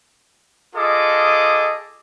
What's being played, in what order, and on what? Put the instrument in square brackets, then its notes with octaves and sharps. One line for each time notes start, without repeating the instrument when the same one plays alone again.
[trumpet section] F4 G#4 A4 D#5 D6